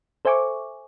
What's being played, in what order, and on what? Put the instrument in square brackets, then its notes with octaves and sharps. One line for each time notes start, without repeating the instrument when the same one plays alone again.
[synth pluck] A4 C5 E5 G#5 C#6 D6